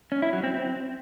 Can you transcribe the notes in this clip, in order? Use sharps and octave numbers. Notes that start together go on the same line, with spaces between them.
C#4
E4
F#3
C4
C4